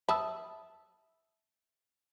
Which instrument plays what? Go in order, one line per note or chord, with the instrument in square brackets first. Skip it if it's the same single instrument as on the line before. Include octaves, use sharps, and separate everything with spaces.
[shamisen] E5 A5 [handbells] B5 D#6 E6